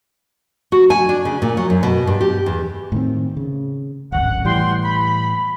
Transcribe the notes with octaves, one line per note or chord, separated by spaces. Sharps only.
F#4
G#5
D4
C#3
A#2
F#3
F#2
B2
G2
G4
E2
A2 D#3 C4
C#3
D1 G#1 F#2 F#5
A2 E3 G3 F#5 G5 C6
B5